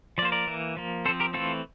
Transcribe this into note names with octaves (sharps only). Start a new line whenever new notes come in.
F3 A#3 C5 D5
A#4 D5
E3 A#3
F3 A#3
F3 C4 A4 C5
G4 A#4
E3 A3 C4 F4 A4